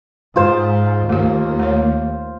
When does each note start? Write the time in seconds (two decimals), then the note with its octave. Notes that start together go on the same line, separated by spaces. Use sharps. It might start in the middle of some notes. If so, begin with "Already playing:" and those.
0.36 G#2 F4 C5
1.09 D#2 A3 A#3 G4
1.59 A3 C#5